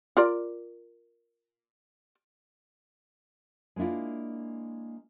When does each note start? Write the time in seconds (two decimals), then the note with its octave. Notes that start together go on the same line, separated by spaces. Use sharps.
0.17 F4 A#4 D5
3.76 G#3 A#3 D4 E4 F4